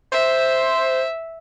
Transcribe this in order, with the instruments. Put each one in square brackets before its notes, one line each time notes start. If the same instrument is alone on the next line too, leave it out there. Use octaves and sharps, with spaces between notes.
[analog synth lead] C5 [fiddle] E5